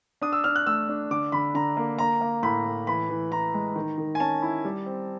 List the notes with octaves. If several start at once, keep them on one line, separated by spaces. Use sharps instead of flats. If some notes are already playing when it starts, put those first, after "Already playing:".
D4 D#6
E6
D4 F6
F#6
A3 E6
D4
D3 D6
D3 B5
D3 A#5
A#3
A#3 A#5
A#3
A2 B5
A2
E3 B5
E3
E3 A#5
G#3
D#3
D#3
G#5
C#4 A5
E4
G3
C4